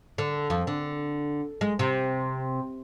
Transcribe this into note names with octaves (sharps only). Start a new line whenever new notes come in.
D3
F2
D3
G#3
C3